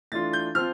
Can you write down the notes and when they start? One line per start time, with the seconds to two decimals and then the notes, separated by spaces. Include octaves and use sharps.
0.12 E3 A3 D4 F4 A6
0.33 G6
0.55 F3 C4 F4 F6